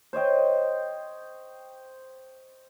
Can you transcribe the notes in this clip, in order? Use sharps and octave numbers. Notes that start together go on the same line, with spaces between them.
C5 C#5 D#5 G5